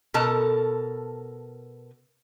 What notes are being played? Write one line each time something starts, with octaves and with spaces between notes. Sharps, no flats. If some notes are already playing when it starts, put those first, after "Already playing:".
B2 A4 A#4 A5